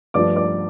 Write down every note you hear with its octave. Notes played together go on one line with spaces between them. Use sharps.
G2 F3 A3 D4 D5 D6
D5 D6